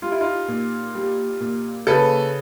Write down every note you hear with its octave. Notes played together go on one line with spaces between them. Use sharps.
G3 F4
E4
D#4 F4
A#2
G3
A#2
C#3 A4 B4